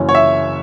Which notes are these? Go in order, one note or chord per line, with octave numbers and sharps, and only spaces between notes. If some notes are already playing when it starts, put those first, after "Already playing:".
Already playing: F#1 F#2 E3 C#4
C#5
E5